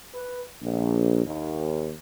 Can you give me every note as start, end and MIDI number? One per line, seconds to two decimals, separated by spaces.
0.15 0.44 71
0.63 1.23 34
1.25 1.94 39